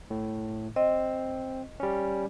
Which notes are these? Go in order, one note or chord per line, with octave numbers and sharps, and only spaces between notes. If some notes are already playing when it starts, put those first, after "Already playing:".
A2
C4 D#5
G3 C#4